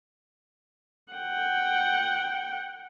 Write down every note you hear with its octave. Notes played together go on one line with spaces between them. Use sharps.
F#5 G5